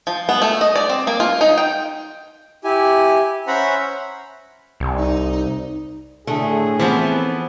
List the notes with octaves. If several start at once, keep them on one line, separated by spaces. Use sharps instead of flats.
F3
B3
A3
D#5
D5
C4
A#3
F4
D#4
G5
E4 G4 G#5
C#4 C5 E5 F#5 A#5 B5
C2
D#4
A2 D3 A3 G#4
E3 F3 B3 C4